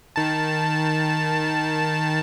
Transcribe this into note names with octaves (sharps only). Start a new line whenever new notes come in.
D#3 A5